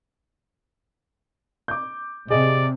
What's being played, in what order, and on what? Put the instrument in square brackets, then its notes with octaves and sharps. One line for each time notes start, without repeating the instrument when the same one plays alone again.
[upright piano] D6 G6
[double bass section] C3 [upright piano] G#4 D#5 [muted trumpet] D5